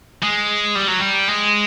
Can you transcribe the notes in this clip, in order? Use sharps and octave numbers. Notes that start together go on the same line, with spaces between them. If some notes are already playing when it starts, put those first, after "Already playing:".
G#3
G3
F#3
G3
G#3